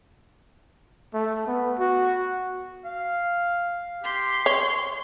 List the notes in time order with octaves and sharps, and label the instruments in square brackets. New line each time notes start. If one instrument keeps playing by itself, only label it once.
[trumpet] A3
B3
F#4
[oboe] F5
[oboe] G4 [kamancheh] C6
[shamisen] C#5 [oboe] C#6